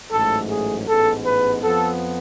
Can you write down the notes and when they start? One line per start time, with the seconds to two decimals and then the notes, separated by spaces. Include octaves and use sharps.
0.11 A1 G#2 F#3 A3 A4
0.49 G#4
0.87 A1 G#2 G#3 B3 A4
1.25 B4
1.63 F2 F3 B3 A4